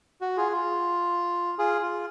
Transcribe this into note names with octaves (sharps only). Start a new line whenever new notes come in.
F#4
F4 G#4
F4
F4 G#4
F4